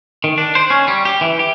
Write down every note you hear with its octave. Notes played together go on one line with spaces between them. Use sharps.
D#3
D4
C5
C#4
G3
G4
E3
G4